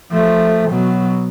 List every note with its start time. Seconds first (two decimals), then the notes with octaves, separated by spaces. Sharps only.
0.11 F3 A3
0.70 B2 F#3